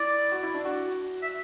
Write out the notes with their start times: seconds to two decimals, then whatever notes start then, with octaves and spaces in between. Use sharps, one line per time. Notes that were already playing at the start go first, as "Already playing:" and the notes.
Already playing: E4 D5
0.32 F#4
0.43 E4
0.54 D4
0.65 F#4
1.22 E5